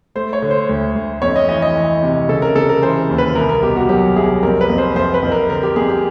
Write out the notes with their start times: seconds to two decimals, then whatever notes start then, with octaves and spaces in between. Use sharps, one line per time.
0.15 A3 C5
0.33 C#5
0.42 D3
0.51 C5
0.69 D2
0.96 D2
1.22 F2 C#5
1.36 D#5
1.49 E3 D#5
1.62 D#5
1.76 E3
2.03 C3
2.29 C#3 A4
2.42 A#4
2.56 C#3 A4
2.69 A#4
2.82 E3 C5
3.09 D#2
3.18 B4
3.35 C2 A#4
3.49 A#4
3.62 B2 G4
3.76 F#4
3.89 F#3 G4
4.16 C2 G#4
4.43 F2 A#4
4.61 B4
4.70 F2
4.78 C5
4.96 F2 C5
5.14 B4
5.23 F2
5.32 A#4
5.49 D3 A#4
5.63 G4
5.76 F2 G#4
5.89 G4